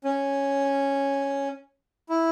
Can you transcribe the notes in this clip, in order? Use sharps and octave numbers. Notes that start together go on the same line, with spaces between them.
C#4
E4